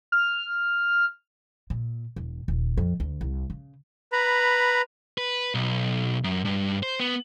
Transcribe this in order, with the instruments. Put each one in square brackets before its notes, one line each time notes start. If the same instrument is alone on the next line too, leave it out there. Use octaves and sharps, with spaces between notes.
[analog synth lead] F6
[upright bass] A#2
E1
D#1
F2
D2
C2
C#3
[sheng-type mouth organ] B4 A#5 B5
[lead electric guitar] B4
B1
F#2
G2
C5
B3